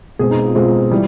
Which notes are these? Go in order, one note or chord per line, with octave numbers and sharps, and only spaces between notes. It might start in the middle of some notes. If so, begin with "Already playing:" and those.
B2 G#3 C4 G#4
D#4
F4
B2 G#3 C4 F4
E3 G3